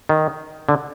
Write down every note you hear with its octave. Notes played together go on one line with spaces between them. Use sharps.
D#3
D3